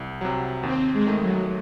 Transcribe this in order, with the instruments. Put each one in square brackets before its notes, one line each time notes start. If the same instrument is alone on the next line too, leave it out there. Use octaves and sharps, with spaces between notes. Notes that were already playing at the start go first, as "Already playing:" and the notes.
Already playing: [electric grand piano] C2
C3 F#3
[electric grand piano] D#2 [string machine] C4
[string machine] G#3
[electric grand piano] D#3 A3
[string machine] F#3